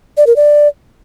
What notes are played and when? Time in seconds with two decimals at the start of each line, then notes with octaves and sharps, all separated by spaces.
0.17 D5
0.27 A#4
0.36 D5